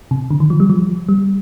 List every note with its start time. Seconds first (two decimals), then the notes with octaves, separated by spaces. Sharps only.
0.11 C3
0.31 D3
0.40 D#3
0.50 F3
0.60 G3
0.70 F3
1.09 G3